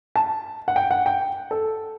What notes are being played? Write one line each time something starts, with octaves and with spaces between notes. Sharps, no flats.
A5
F#5
G5
F#5
G5
A4